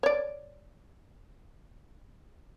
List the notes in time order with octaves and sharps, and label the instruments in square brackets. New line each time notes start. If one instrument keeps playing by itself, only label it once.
[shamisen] C#5 D5